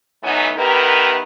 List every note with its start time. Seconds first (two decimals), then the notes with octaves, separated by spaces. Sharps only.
0.24 E3 F#3 A3 B3 C#4 D#4
0.57 D#3 B3 E4 G4 A#4 B4